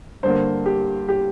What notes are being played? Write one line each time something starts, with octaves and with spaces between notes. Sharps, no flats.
G2 D3 A#3 C5
G4
G4